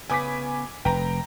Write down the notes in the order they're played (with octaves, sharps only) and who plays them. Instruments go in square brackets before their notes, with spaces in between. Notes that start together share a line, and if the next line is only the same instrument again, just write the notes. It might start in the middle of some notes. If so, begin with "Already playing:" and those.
[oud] C#3 B3 B4 [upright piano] G#5 D6 B6
[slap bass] F1 [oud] B4 [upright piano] G5 A#5